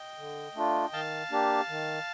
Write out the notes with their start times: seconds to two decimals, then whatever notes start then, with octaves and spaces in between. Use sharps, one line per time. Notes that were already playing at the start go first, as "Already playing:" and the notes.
Already playing: D#5 G5
0.18 D3
0.55 A3 D4 F4
0.93 D#3 F5 A5
1.31 A#3 D4 G4
1.69 D#3